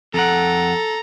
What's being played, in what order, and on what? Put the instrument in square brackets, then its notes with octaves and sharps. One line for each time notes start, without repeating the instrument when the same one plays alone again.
[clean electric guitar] F2 F#5 [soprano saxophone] A4 [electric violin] A#5